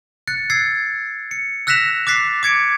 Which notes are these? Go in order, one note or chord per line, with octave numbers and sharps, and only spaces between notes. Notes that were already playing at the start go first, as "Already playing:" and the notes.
F#6 A6 C#7
E6 G#6 A6 C7
C#7
E6 F#6 A#6 B6 E7 F7
D6 F#6 A6 B6 C7
D6 G#6 C#7 D7